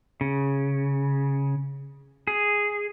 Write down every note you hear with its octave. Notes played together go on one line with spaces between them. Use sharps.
C#3
G#4